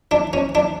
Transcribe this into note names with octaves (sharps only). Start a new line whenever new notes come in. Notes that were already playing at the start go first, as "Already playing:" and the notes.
D4
C#4
D4